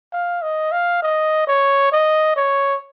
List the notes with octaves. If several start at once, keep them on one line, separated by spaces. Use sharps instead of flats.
F5
D#5
F5
D#5
C#5
D#5
C#5